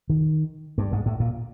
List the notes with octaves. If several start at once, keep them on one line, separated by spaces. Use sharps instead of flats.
D#3
G2
G#2
A2
A#2